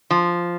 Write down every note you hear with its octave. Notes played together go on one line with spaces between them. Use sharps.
F3